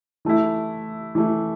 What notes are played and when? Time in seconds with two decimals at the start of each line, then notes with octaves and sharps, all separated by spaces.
0.25 E3 A3 E4
1.15 E3 A3 E4